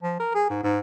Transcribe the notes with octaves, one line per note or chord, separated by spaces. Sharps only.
F3
A#4
G#4
G#2
G#2